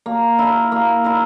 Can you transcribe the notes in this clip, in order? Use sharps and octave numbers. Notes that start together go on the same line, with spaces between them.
A#3
E4 A#4
A#3
E4 A#4